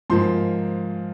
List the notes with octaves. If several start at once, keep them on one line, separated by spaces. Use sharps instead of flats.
G#2 F3 A#3 C6